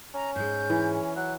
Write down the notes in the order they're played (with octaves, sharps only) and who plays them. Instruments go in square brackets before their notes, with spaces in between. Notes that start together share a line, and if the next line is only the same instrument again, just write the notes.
[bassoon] C#4 [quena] A#5
[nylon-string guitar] G#2 G#3 [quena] G6
[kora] E3
[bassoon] F#3 [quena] F#6